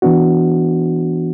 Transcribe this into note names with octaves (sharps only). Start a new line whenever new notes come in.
E3 B3 D4 F#4